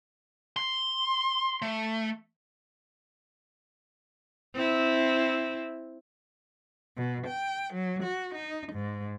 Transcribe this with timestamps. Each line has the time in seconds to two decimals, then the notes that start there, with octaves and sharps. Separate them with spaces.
0.57 C6
1.62 A3
4.55 C4 E4
6.97 B2
7.27 G5
7.74 F#3
8.03 F#4
8.35 D#4
8.73 G#2